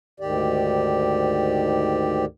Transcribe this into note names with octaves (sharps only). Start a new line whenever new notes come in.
D2 G#2 D#3 G4 D5